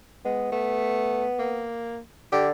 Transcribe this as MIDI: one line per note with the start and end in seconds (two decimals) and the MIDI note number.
0.25 0.49 56
0.25 0.51 59
0.52 1.26 57
0.52 1.64 59
1.39 1.99 58
2.32 2.52 50
2.32 2.47 67